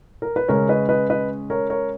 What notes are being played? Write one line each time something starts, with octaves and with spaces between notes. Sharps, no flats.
A#4
B4
C#3 G#3 C#4 A#4 C#5
B4 D#5
B4 D#5
B4 D#5
A#4 C#5
A#4 C#5